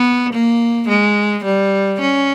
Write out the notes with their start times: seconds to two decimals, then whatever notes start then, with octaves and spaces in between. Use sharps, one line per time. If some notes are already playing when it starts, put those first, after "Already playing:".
Already playing: B3
0.33 A#3
0.89 G#3
1.45 G3
2.01 C#4